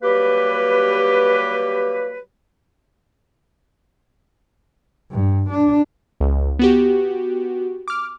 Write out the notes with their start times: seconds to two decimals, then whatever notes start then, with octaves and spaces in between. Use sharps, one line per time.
0.03 F#3 G3 A#3 G4 B4
5.12 G2
5.51 D4
6.20 C#2
6.59 B3 F#4 G4
7.88 D6 F6